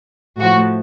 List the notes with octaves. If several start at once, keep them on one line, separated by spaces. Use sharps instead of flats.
A2 F3 F#4